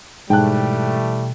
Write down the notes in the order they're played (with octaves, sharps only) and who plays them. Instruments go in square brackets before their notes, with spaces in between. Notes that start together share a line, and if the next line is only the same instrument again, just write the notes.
[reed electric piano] G#2 [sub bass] B2 [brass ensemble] E3 G3 A3 [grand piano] G5 A5 F#6